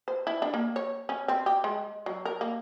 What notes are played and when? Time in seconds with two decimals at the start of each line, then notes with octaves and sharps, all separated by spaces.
0.08 C5
0.27 E4
0.42 D4
0.54 A#3
0.76 C#5
1.09 C#4
1.28 C4
1.46 G4
1.64 G#3
2.06 F#3
2.25 A#4
2.41 A#3